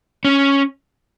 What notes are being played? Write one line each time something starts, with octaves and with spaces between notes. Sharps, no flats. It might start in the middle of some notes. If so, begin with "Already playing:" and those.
C#4